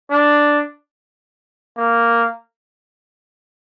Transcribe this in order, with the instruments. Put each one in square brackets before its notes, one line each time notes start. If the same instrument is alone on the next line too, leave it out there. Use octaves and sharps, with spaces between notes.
[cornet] D4
A#3